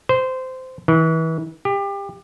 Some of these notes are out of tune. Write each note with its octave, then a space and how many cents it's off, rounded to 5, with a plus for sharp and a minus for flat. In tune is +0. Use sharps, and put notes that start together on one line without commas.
C5 -15
E3 -35
G4 +25